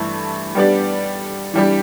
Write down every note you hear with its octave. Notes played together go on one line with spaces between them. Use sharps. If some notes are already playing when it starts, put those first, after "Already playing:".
Already playing: G2 E3 A3
G3 B3 D4 G4 D5
E3 G3 D4 G4